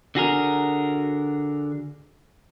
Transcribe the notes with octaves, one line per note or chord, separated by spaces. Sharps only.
D3 F#4 G#4 A#4